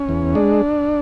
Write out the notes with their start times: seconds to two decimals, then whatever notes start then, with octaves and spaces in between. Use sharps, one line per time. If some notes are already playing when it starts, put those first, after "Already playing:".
Already playing: C#4
0.09 E2
0.35 G#3 D4